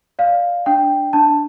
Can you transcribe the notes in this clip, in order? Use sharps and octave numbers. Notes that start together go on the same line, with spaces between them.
D5 F5
D4 G5
D4 A5